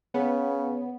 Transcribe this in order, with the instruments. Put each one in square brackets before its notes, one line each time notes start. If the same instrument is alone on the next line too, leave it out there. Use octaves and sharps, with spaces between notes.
[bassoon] C#3 [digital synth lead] B3